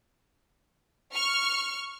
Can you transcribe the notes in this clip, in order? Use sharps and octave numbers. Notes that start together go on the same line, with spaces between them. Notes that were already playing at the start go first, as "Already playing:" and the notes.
C#6 F6